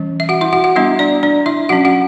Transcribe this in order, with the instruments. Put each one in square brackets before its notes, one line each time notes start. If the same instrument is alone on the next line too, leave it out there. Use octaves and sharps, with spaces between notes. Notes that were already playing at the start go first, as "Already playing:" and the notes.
Already playing: [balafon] E3 G3 C#4
E5
F#4 F#5
E4 E5
F#4 F#5
F#4 F#5
G3 B3 D4 E4 E5
D4 D5
D4 D5
E4 E5
F#3 C#4 F#4 F#5
F#4 F#5